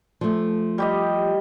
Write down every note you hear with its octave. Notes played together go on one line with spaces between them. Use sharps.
F3 A3
G3 G4 D#5